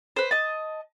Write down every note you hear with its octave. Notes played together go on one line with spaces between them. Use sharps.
B4 C5
D#5 A5